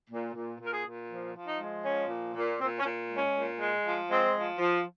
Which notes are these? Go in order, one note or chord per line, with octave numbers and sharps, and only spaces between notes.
A#2
A#2
A#2
A#4
G#4
A#2
F3
F3
D#4
G#3
F3 C#4
A#2
A#2
A#2 C4
C#4
A#2
G#3
C#4
A#2
G#3
F3
G#3 C4
F3
F3